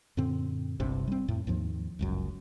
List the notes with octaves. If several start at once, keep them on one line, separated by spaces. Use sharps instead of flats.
F#2 A#2 D3 C4
G1 C2 G2 C3
G3 C4
F2 A2
D#2 G#2 F3
G1 C#2 F#2